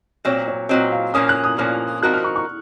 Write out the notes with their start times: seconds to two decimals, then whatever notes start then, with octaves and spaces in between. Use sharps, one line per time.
0.25 A#2 F#3 C4 C#5
0.48 C#5
0.69 A#2 F#3 C4 D#5
0.92 F5
1.14 A#2 F3 A#3 C#4 D#6
1.29 F#6
1.44 D#6
1.58 A#2 F3 A#3 C#4 F6
2.03 F3 C4 D#4 F#4 A#4 F#6
2.14 F6
2.24 C#6
2.36 C#6